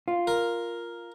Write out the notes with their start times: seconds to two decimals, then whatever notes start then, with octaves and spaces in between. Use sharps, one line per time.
0.08 F4
0.27 A#4